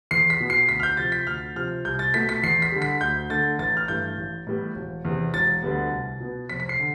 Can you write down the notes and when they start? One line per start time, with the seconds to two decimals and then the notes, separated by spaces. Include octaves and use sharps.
0.11 E2 C7
0.30 B6
0.40 B2 B3
0.50 C7
0.69 D2 B6
0.80 F6
0.83 G6
0.97 C3 F3 A6
1.12 B6
1.26 D2 F6
1.56 C3 F3 F6
1.85 C2 G6
1.99 A6
2.14 B2 A3 B6
2.29 B6
2.43 E2 C7
2.62 B6
2.72 D3 G3
2.82 B6
3.01 D2 G6
3.30 D3 A3 A6
3.59 A1 A6
3.77 F6
3.88 G2 E3 A3 G6
4.18 A1
4.47 A2 E3 G3 B3
4.75 E1
5.05 E2 C3
5.34 E1 A6
5.62 D2 D3 G3 B3
5.91 C2
6.20 B2 B3
6.49 F1 B6
6.60 B6
6.69 C7
6.79 D3